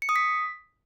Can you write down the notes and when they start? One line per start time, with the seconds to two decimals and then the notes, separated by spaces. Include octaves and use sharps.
0.02 C#7
0.09 D#6
0.16 B6